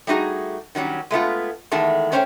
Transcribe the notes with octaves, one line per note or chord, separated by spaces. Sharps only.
G3 A3 D#4 F#4 G#4
D#3 F#3 G3 C#4
G#3 A3 B3 F4
E2 D#3 G#3 A3 A5
A3 C#4 C5 C#5 F5 G5